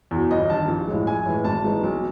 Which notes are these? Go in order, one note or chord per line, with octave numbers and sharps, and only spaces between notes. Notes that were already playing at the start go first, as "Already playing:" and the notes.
E2 B2
G1 D#5
G2 D#3 A5
A#1
A2 F3 G#3
A#1 G#5
A2 E3 G#3
G#1 A5
G#2 E3 G#3
B1